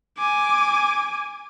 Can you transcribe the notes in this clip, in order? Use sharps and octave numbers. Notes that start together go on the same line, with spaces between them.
G#5 D6